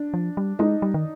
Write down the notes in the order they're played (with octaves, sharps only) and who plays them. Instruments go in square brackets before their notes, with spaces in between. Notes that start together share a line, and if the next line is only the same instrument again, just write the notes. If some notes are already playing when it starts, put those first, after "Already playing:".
Already playing: [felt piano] D4
[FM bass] F3
G3
[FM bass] G#3 [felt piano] D#4
[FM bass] G3
D#3